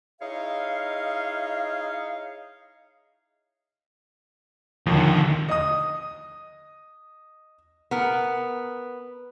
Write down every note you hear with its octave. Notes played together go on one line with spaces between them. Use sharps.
D#4 E4 G#4 C#5 D#5 F5
D#2 D3 D#3 F3
D#5 D#6
B3 A#4